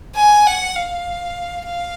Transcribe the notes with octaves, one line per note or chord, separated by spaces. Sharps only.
G#5
F#5
F5
F5